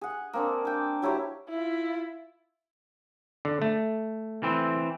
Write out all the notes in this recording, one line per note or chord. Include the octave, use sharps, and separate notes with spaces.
G#4 F#5
A#3 C4 D4
G5 D6
F#3 E4 G4 C#5
E4 F4
D3
A3
E3 C4